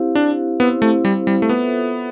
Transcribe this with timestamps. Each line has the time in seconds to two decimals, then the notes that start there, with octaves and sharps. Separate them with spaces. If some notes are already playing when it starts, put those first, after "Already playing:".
Already playing: C4 E4 G4 C5 F5
0.15 D4
0.60 B3 C4 E4 G4 C5 F5
0.82 A3
1.05 G3
1.27 G3
1.42 A3
1.49 B3 F4 A4 C5 E5